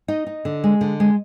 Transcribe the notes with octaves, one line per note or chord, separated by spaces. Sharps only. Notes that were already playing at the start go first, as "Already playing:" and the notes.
D#4 D#5
D#4
D3
G#3
D3
G#3